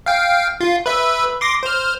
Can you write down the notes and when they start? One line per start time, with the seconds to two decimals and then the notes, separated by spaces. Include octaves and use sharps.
0.06 F5 G5
0.60 F4
0.86 B4 E5
1.41 C6 D6 A#6
1.63 C5 F6